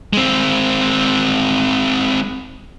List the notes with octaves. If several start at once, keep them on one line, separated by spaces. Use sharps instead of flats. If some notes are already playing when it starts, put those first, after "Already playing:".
G#3 C4